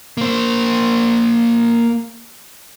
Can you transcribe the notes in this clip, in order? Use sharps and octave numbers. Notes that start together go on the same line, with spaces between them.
A#3 C5